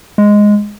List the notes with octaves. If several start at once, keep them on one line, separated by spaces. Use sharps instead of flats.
G#3